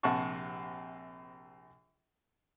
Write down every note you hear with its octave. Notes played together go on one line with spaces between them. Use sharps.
A#1 C3 F#5 A5 C#6